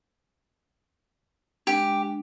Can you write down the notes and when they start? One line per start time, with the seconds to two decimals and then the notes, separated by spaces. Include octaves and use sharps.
1.67 G#3 D4 G4